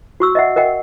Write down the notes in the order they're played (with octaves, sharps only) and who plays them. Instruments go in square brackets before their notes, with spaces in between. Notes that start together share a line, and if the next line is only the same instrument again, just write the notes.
[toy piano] F#4 C#6 E6
D#5 E5 F#5
A#4 D#5 F#5 G5